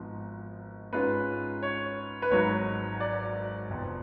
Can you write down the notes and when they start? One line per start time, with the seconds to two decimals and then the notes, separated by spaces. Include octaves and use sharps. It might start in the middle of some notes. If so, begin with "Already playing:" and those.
Already playing: G#1 G#2 F3 B3
0.93 G#2 G#3 C#4 F4 B4
1.62 C#5
2.22 B4
2.31 G#1 G#2 F#3 C#5
3.00 D5
3.69 F1 F2 F3 B3